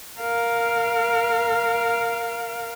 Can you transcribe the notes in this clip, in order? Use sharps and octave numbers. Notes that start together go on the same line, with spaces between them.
A#4 F5